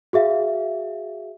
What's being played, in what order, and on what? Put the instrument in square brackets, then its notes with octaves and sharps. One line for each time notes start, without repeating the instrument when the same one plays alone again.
[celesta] F#4 G#4 E5 F5